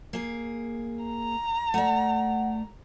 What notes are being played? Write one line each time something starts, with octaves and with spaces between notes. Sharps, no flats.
A#3 G#4
A#5
A3 D5 F#5